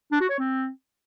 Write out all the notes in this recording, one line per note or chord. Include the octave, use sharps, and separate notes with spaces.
D4
F#4
C#5
C4